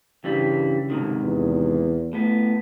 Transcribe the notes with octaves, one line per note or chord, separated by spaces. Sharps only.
G2 C#3 E3 G3
G#2 C3 D#3
E2
A2 B3